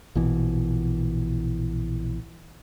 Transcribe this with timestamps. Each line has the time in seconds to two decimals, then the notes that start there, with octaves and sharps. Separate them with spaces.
0.15 A#1 B2 E3